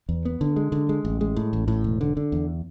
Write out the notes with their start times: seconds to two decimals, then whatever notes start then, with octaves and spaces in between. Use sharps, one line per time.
0.09 E2
0.25 B3
0.41 D3
0.56 G#3
0.72 D3
0.89 G#3
1.05 A1
1.21 G#3
1.36 A2
1.53 A1
1.68 A2
1.84 E1
2.01 D3
2.17 D3
2.32 E2